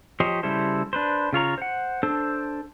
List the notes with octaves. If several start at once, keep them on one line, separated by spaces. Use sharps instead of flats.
F3 G4 C5 C#5 D#5
C#3 G3 E4 A4 C5
D4 B4 C5
C#3 F4 C#5 A#5
C5 F#5
D4 A4 C5